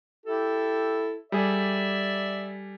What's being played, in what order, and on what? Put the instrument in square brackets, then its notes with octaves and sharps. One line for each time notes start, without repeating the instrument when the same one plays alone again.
[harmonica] E4 G4 A4
[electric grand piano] G3 G#4 A4 [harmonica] D5 E5